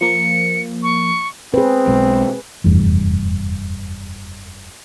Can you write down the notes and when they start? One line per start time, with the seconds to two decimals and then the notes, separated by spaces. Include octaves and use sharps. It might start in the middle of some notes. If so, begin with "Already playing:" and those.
0.01 F3 A#3 C#7
0.83 C#6
1.54 C4 G#4 B4
1.88 B1 B2 G#3
2.64 F1 E2 G2